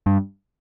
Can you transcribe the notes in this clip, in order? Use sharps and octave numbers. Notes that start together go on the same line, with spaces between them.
G2